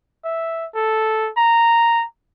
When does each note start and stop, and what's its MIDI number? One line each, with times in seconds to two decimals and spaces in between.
0.24 0.66 76
0.75 1.29 69
1.37 2.05 82